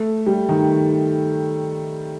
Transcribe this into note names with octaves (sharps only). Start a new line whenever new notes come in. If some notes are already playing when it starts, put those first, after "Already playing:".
Already playing: A3
G3
D#3